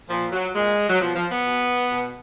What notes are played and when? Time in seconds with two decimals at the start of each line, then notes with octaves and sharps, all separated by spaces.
0.10 A#2 F3
0.32 F#3
0.55 A#2 G#3
0.90 F#3
1.01 B2 F3
1.16 F3
1.31 B3
1.47 B2
1.92 B2